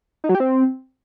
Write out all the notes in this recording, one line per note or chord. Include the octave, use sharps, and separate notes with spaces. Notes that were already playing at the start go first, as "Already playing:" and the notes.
D#4
F#3
G4
C4